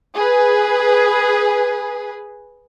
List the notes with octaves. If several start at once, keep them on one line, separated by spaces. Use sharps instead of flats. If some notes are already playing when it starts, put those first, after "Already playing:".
G#4 B4